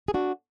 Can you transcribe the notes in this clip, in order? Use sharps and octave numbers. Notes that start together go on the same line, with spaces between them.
G#4
D4 F#4